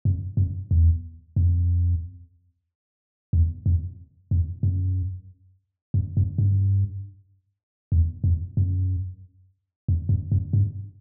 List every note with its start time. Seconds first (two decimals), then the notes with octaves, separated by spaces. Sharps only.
0.05 F#2
0.37 F#2
0.71 E2
1.36 F2
3.33 E2
3.66 F2
4.31 F2
4.63 F#2
5.94 F#2
6.17 F#2
6.38 G2
7.92 E2
8.24 F2
8.57 F#2
9.88 F2
10.09 F#2
10.32 F#2
10.53 G2